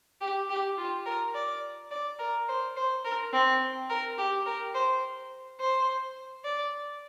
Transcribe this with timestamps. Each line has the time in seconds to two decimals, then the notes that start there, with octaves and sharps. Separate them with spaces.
0.21 G4
0.50 G4
0.78 F4
1.06 A#4
1.34 D5
1.91 D5
2.19 A#4
2.48 C5
2.77 C5
3.05 A#4
3.33 C4
3.90 A#4
4.18 G4
4.46 A#4
4.74 C5
5.60 C5
6.45 D5